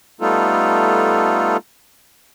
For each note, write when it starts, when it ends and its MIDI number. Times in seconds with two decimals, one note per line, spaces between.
0.21 1.57 55
0.21 1.57 57
0.21 1.57 59
0.21 1.57 63
0.21 1.57 65
0.21 1.57 69